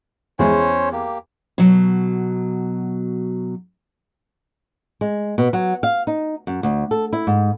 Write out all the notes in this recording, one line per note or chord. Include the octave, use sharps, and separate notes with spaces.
E2 G#3 C#4 C5 C#5
A#3 G4
B2 F#3
G#3
B2
F#3
F5
D#4
F#2
D2
A4
E4
G#2